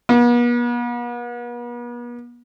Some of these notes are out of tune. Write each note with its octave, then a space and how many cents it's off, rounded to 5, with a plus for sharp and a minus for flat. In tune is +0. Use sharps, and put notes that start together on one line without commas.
B3 -45